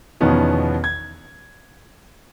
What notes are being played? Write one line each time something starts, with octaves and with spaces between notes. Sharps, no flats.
E2 B2 D#3 F3 B3 C#4
G#6